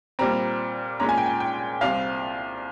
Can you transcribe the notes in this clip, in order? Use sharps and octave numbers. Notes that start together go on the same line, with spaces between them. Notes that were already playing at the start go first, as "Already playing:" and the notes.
A#2 G3 C4 A#5
A#2 G#3 C#4 A#5
G#5
G5
G#5
G5
C2 C3 G3 C4 F5